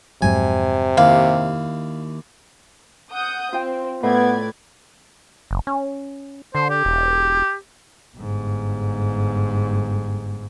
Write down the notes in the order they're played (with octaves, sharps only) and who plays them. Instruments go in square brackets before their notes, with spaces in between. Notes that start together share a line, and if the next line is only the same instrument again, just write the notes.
[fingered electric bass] F2 G#2 F#3 [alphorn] C3 [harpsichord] G#5
[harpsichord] D#2 E4 [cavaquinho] F5
[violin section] F#5 D#6 G6
[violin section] C4 [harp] F4 G5
[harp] A2 [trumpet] B3 [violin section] B4 D5 G#6
[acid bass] F#1
C#4
[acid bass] D3 [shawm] C5
[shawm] G4
[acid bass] E1
[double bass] G1 G#2